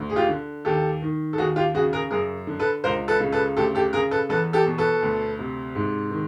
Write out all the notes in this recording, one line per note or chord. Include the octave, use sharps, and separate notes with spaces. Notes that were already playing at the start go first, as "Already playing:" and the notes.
Already playing: D2
G#4
F4 G4
D3
D#2 G4 A4
D#3
A4
D#2 F#4 G#4
F4 G4
C#3 F#4 G#4
G#4 A#4
F#2 G#4 A#4
D3
A4 B4
C#2 A#4 C5
A4 B4
C#3
A4 B4
D2 G4 A4
G4 A4
C#3 G#4 A#4
A4 B4
E2 A4 B4
G4 A4
B2
A4 B4
D2
C3
G#2
D#3